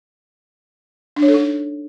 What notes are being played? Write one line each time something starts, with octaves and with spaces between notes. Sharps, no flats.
D4
C#5
A4
D#4